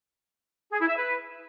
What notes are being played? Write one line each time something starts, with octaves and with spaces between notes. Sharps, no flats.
G#4
E4
E5
B4